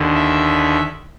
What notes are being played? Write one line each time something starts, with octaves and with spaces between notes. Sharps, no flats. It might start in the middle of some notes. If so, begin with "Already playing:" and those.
Already playing: D#2 D3
E5